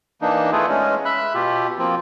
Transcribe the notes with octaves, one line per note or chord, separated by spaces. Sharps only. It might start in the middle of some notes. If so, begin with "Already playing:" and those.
E3 A#3 D4 D#4
A3 B3 E4 F4 G#4 B4
G#3 C#4
E5 B5 F#6
B2 F4 G4
F3 A#3 C4 F4